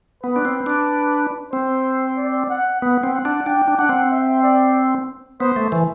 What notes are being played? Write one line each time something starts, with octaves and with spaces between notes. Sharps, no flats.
B3 B4
D4
C4
D4
C4 C5
D5
F#5
B3 F#5
C4
F#5
D4
D4 G5
D4
D4 F#5
C4
E5
D5
B3 C5
A3
E3